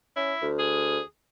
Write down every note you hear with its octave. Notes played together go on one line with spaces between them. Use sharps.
C#4 E4
D2
G#4